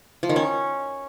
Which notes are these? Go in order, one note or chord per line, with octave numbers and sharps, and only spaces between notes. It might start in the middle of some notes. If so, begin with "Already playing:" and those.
F3
D#3
C#4